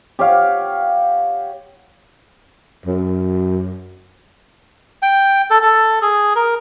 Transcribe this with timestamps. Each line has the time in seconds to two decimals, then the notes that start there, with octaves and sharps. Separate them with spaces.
0.19 G4 C#5 F5 F#5
2.86 F#2
5.02 G5
5.51 A4
5.63 A4
6.02 G#4
6.36 A#4